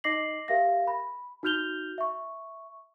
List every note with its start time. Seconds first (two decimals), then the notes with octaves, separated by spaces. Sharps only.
0.04 D#4 D#5 D6 A#6 C7 F#7
0.48 G4 A#4 E5 F5 A#6
0.87 B5
1.43 D#4 F#4 F6 G6 F7 G7
1.98 E5 C#6